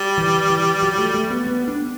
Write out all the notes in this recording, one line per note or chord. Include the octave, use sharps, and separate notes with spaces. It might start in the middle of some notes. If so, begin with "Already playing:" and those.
Already playing: G3
E3
E3
F#3
A3
A3
B3
B3
D4